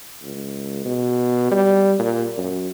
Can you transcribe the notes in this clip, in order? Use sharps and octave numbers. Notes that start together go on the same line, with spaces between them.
C#2
B2
G3
A#2
F#2